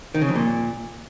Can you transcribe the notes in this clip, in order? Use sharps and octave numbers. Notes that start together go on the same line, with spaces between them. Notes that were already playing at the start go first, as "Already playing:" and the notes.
D#3
C#3
F2
A#2